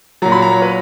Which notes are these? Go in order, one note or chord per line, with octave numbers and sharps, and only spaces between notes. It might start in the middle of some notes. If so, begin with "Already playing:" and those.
A#2 F#3 A#5
B5
A#5
C#5
B4